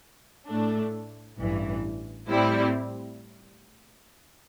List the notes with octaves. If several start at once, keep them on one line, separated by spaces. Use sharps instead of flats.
A2 A3 D4
A1 G2 E3
A2 G3 C4 E4